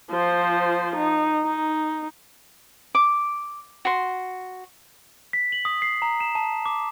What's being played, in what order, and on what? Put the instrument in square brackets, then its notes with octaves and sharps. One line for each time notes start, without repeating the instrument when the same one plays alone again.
[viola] F3 C5
D#4
D#4
[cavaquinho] D6
F#4 C6
[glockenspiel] B6
F#7
D#6
C7
A#5
E7
A5
D6